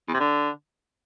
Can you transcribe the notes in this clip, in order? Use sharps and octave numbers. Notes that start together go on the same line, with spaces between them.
E2
C3
D3